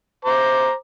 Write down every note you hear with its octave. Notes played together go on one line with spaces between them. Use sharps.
C5 A#5 D6